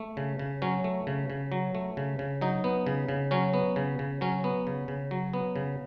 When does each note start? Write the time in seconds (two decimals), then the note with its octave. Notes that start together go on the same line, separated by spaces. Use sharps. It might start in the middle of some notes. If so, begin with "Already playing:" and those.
Already playing: A3
0.17 C#3
0.39 C#3
0.62 F#3 C#4
0.84 A3
1.07 C#3
1.30 C#3
1.52 F#3
1.75 A3
1.97 C#3
2.19 C#3
2.41 F#3 D#4
2.64 B3
2.87 C#3
3.09 C#3
3.31 F#3 C#4
3.54 B3
3.76 C#3
3.99 C#3
4.21 F#3 C#4
4.44 B3
4.67 C#3
4.88 C#3
5.11 F#3
5.34 B3
5.56 C#3